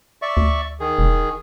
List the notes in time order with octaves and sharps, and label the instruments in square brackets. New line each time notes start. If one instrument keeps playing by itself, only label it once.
[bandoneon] D5 E5 C#6
[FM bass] D2
[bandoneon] D#3 G#4
[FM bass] E1